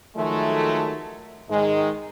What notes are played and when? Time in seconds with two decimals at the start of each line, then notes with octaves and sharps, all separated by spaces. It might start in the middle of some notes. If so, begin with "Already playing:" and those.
0.16 D#3 F3 F#3 G#3 A3
1.49 G#2 D#3 G#3